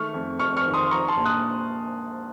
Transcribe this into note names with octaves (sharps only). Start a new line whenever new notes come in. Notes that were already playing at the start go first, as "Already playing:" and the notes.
Already playing: D#3 A3 C#6 F6
F2
F2 C#6 F6
C#6 F6
D#3
C6 D#6
F3 A#5 C#6
A5 C6
A#1
D#6 F#6